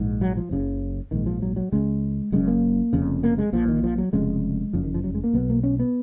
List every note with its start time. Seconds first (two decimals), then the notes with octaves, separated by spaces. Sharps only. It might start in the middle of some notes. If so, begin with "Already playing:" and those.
Already playing: A#1 G#2
0.21 F#3
0.37 F3
0.51 F#1 F#2 C#3
1.11 A#1 G#2 D#3
1.26 F3
1.42 F#3
1.56 F#3
1.72 C#2 C#3 G#3
2.32 F#1 F#2 C#3 G#3
2.48 A#3
2.93 F1 F2 C#3
3.23 A#3
3.38 G#3
3.52 A#1 A#2 F3
3.68 D#3
3.84 F3
3.98 F#3
4.13 F1 F2 C#3 G#3
4.73 F#1 F2 C#3 F3
4.84 D#3
4.94 F3
5.04 F#3
5.14 G#3
5.24 A#3
5.33 B1 B2 B3
5.50 A#3
5.64 C#4
5.79 B3